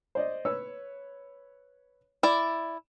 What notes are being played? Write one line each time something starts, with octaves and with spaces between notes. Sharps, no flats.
C5 D5 D#5
B4 C#5 E6
E4 D5